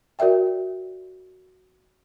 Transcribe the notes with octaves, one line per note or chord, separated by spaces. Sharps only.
F#4 A#4 D5 E5 G5